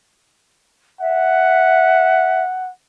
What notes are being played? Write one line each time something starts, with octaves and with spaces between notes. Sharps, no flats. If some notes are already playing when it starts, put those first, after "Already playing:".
E5 F#5